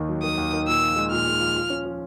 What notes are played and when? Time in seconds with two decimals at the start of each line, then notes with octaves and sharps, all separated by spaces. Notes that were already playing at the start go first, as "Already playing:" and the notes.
Already playing: D#2 D#3
0.09 F#3
0.23 D#3 D#6
0.38 D#2
0.53 D#3
0.68 A#2 E6
0.82 F3
0.96 G#3
1.11 A#2 F6
1.27 G#3
1.40 F3
1.56 F3
1.70 C#4
1.85 F3